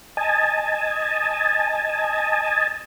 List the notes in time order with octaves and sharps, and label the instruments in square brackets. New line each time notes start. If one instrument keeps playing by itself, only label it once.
[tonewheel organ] D#5 G#5 A5